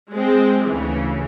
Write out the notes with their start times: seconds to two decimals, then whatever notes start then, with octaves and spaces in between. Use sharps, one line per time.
0.12 G#3 C4
0.65 D2 C#3 E3